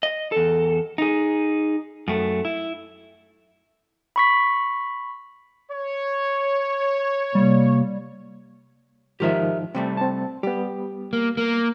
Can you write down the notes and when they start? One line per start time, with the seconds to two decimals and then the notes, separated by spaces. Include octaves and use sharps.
0.03 D#5
0.32 E2 A4
0.98 D#4 G#4
2.08 F#2 A3
2.45 E4
4.16 B5 C#6 B6
5.71 C#5
7.35 C3 G3 A#3
9.20 G#2 D#3 F3 G4 A#4 E5
9.75 C3 G3 A3 C4
9.97 C4 A5
10.43 G3 B3 G4
11.13 A#3
11.37 A#3